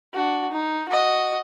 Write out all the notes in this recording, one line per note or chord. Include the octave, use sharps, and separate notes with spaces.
D4 F#4
D#4
F#4 D#5